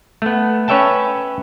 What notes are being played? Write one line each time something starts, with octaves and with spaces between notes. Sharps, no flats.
A3 B3
C#4 B4 C#5 E5 G5 A5